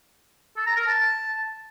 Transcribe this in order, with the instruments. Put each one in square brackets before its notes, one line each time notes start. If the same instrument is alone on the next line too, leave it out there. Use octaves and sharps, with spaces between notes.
[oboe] A4
A#5
A#4
A5